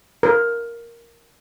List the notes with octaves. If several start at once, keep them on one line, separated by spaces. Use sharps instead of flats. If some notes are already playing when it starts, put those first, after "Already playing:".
A#4